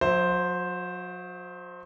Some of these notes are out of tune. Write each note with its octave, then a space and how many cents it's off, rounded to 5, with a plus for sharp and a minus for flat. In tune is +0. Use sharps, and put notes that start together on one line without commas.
F#3 -40 C5 +0 E5 +0